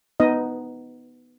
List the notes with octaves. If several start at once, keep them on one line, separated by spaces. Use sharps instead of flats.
B3 D#4 D#5